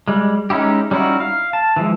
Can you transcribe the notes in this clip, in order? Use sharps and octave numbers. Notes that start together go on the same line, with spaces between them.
G3 G#3
G#3 C#4 D#4 E4 G4
G3 C#4 D#4 E4 F#4
F5
A5
E3 F3 G#3